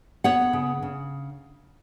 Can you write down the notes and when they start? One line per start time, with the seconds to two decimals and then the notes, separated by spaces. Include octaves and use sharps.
0.24 B3 C#5 F#5
0.53 C#3
0.82 C#3